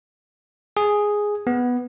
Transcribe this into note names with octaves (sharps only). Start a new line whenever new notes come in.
G#4
B3